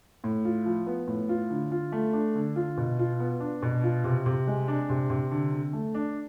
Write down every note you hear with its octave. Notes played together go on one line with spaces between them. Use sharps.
A2
F4
F3
B3
A2
F4
D3
F4
A3
D4
D3
F4
B2
F4
B3
D4
B2
F4
C3
C3
G#3
D4
C3
C3
D3
D3
A3
D4